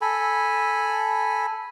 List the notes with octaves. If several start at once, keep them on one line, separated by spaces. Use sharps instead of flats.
A4 G#5 B5